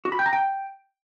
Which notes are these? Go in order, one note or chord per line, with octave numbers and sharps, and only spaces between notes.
F#4
B5
G5
A#5
G5